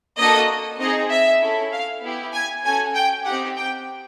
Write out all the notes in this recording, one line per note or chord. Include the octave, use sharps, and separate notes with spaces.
A#3 D4 F#4 A4 D#5
C4 D#4 G#4 D#5
E5
C#4 E4 A4
F5
B3 E4 G4
G#5
C#4 F#4 A4 G#5
G5
C4 D#4 G4 F#5
G5